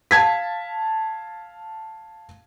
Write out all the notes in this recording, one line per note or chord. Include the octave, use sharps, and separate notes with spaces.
F5 A5 G#6 B6